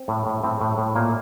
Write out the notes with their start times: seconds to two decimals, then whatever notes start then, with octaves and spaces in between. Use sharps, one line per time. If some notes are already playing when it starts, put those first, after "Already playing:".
Already playing: C4
0.08 A2
0.26 A2
0.44 A2 C4
0.61 A2
0.78 A2
0.95 A#2 A#3